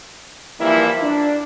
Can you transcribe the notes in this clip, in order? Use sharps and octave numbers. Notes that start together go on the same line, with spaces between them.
E3 F3 G3 A#3 E4
D4